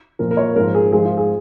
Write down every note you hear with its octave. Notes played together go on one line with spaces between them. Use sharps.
A#2 F3 A#4
A#4
C#5
G#2 F3 A#4
G#4
G#2 F3 G#4
F4
G#4